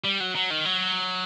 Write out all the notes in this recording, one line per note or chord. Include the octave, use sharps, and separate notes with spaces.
G3
F#3
F#3
D#3
F#3